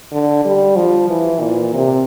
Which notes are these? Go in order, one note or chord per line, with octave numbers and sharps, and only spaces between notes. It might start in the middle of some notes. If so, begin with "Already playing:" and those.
D3
G3
F3
E3
A#2
C3